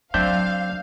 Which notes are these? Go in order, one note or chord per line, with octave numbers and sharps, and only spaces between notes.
F#3 C4 D4 E5 F5 G6